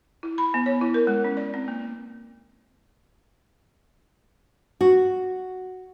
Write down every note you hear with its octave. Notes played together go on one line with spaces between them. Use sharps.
E4
B5
B3
C#5
E4
A#4
G#3
C#4
D5
C4
A#3
F#4